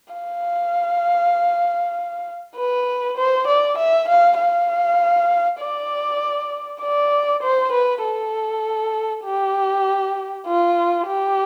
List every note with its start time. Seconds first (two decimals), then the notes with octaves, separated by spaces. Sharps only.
0.13 F5
2.56 B4
3.17 C5
3.47 D5
3.78 E5
4.08 F5
4.39 F5
5.60 D5
6.81 D5
7.42 C5
7.72 B4
8.04 A4
9.24 G4
10.46 F4
11.07 G4